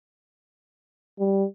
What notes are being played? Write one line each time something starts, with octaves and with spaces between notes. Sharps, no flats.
G3